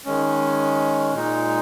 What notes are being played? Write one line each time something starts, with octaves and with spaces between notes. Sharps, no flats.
D#3 G#3 C#4
A#2 G#3 D#4